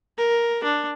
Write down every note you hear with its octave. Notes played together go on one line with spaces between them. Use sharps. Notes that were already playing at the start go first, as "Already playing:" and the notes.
A#4
D4